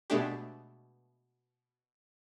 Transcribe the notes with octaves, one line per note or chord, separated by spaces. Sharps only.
B2 G#3 A3 D4 G4